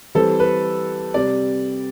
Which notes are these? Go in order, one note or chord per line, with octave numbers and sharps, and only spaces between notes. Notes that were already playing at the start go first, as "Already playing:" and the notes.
E3 G3 C4 A4
B4
C3 G3 D5